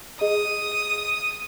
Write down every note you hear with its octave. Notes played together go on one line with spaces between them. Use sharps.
G#4 D#5 D#6